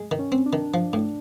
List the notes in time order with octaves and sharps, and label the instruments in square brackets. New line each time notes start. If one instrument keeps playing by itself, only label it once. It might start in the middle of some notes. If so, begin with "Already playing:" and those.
Already playing: [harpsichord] G#3
D#3
[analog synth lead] C#4
[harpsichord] C4
[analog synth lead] D4
[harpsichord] D#3
F3
A2